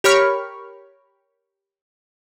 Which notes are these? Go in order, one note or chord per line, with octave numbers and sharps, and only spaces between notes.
G4 A#4 C#5 B5 C#6 F6